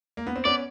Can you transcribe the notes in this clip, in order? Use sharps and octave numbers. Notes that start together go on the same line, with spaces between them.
A#3
B3
C4
B3 C#4 D5